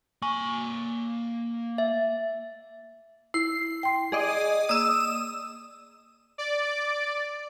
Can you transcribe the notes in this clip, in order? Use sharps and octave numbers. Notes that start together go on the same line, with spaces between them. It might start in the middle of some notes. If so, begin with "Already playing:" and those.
A#3 G#5 C#6
E5
E4 C7
G5 C6
G#4 D5 D#5
A#3 D5 D#6 E6
D5